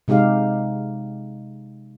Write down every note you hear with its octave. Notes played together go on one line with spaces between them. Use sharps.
C3 G#3 D#4 G4 F5